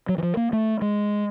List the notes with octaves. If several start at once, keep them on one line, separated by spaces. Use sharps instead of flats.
F#3
E3
F3
A#3
A3
G#3